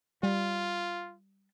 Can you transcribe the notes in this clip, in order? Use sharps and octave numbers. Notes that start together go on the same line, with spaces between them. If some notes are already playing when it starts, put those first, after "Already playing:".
G3 F4